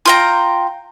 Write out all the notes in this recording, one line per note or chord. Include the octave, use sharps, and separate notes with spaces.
F4 G5 A#5